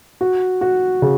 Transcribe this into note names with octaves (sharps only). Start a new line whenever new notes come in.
F#4
F#4
C#3